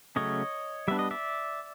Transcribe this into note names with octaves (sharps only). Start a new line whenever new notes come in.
C#3 F#3 A3 C#4 C#5 D#5
G3 B3 D4 E5
D#5
D5 E5